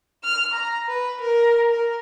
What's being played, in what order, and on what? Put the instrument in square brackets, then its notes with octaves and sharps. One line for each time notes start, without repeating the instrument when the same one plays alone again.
[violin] F6
A#5
B4
A#4
A#4